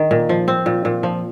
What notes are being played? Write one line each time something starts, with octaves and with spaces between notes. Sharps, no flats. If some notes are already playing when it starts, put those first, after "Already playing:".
Already playing: D#3
A#2
F3
C4
A#2
A#2
F3